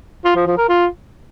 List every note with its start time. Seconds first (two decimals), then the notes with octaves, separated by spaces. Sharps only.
0.24 F4
0.35 F3
0.47 F3
0.58 A#4
0.69 F4